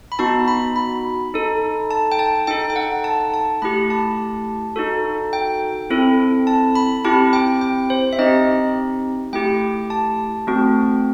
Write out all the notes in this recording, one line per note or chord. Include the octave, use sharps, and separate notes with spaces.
B5
B3 D#4 F#4 A5
B5
B5
D#4 A4
A5
G5
A5
D#4 A4 G5
G5
F#5
A5
A5
A3 E4 G4 B5
A5
D#4 F#4 A4
G5
C4 E4 A4
A5
B5
C4 E4 G4 A5
G5
G5
C5
E5
C4 D#4 G4 D#5
A3 E4 G4 G5
A5
A3 C4 F#4